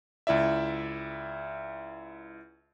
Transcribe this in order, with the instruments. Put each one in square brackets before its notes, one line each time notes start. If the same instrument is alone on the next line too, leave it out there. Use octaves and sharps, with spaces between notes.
[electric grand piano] C#2 E4 D5 E5